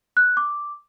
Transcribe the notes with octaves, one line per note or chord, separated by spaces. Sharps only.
F#6
D6